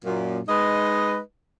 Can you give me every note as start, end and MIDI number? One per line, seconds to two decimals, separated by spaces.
0.05 0.39 42
0.05 0.39 46
0.48 1.18 56
0.48 1.18 63
0.48 1.18 71
0.48 1.18 75